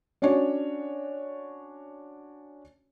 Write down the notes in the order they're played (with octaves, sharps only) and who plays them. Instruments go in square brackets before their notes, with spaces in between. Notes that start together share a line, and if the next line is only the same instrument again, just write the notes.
[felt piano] C#4 D4 F#4 C#5 D5